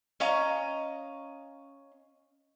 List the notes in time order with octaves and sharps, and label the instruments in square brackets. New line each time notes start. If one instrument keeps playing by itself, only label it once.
[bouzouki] C#4 D#5 F5 A#5